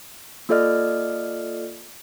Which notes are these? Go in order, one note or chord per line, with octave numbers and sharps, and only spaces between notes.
A#3 F4 A4 D5 D#5 F6